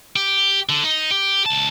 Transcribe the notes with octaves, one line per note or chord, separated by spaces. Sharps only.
G4
D3
D#4
G4
C#2 A5